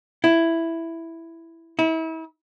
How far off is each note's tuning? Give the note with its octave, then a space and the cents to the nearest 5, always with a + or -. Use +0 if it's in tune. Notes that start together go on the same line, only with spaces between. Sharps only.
E4 +5
E4 -35